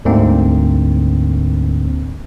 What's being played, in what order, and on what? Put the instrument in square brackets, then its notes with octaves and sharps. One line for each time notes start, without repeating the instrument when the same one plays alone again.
[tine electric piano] D2 G#2 D3 A#3 C4